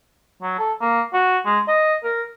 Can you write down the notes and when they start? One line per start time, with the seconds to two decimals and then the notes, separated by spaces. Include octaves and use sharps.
0.42 F#3
0.59 A4
0.82 A#3
1.14 F#4
1.46 G#3
1.68 D#5
2.04 A#4